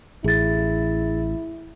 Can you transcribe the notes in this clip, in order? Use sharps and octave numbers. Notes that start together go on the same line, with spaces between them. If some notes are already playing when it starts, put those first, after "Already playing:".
A1 E4 G#4 A6